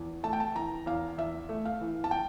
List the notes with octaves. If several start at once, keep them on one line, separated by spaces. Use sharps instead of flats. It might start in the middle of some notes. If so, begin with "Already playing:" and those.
Already playing: E2
A3 A5
G5
A5
E3 A#5
E2 F5
E2 E5
A3
F5
E3
A5
G5